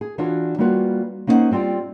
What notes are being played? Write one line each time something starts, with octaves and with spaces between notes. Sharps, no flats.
G#4
E3 D4 F4 F#4 C#5
G3 A#3 F4 F#4 B4 C#5
A#3 C#4 D#4 E4 C5 F#5
G3 C4 F4 D5 G5